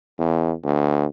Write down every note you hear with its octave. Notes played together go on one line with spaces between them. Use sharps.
E2
D2